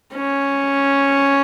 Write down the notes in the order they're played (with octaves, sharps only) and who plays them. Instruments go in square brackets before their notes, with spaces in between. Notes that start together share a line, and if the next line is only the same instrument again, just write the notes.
[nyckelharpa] C#4